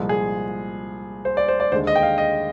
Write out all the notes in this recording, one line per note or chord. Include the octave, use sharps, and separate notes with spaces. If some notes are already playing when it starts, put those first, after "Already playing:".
Already playing: C2 A#2 F3 G#3
G#4
C5
D5
C5
D5
D#2 D3 G#3 C5
D#5
G5
F5
D#5